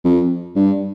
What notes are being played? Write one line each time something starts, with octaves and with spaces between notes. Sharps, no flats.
F2
G2